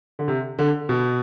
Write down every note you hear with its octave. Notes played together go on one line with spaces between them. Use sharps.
D3
C3
D3
B2